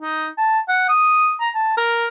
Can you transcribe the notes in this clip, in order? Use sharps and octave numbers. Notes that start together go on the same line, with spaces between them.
D#4
A5
F#5
D#6
A#5
A5
A#4